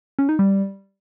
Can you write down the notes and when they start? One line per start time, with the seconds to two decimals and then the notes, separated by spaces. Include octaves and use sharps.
0.19 C#4
0.29 D#4
0.39 G3